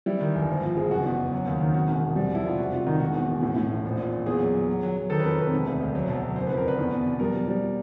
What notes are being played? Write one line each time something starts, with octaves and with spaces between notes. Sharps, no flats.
G3 E4
D#3
G1
G#1
F3
G#3
F#1 F#4
E2
F#1
F#3
D#2
D#3
C3 F#4
E1
C3
G3
B1 E4
G3 F4
F1 F#4
C3 F4
D#3 D#4
E1 F#4
E2
E1
A2
A2
A1
A#1
A#2
A#2
E2 G#4
F#3
F#3
F#3
F#3
F#3
D#3 A4
B4
F2 A#4
C3 B4
E1
D2
D2
F#3
B1
F#3
F#1 C5
F2 B4
A#4
D3 B4
E2
B2
B2
G3 A#4
G3
G3